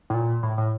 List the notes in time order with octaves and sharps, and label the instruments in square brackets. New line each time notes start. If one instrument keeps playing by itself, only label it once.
[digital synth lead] A2
A#2
A2
A2